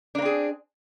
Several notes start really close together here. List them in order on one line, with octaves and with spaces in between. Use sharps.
D4 A#3 C4 G#4